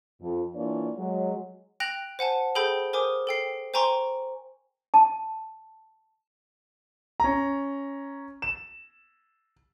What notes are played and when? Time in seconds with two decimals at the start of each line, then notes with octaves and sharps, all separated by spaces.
0.22 F2
0.55 E3 A#3 D4 F4 C#5 D5
0.97 F#3 G#3
1.80 G5 F#6 A#6 F7 F#7
2.19 C5 F#5 G#5 A5
2.55 G#4 A4 C5 G5 B5 G6
2.93 A#4 C5 G#5 D6 D#6
3.27 A4 G5 C7
3.74 C5 G5 G#5 A#5 C6 C#6
4.94 A5
7.20 C#4 A#5
8.42 E7